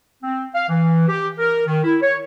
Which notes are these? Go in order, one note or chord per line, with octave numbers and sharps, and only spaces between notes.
C4
F5
E3
G4
A#4
D#3
E4
C#5